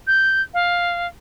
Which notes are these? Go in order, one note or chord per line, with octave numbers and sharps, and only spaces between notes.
G6
F5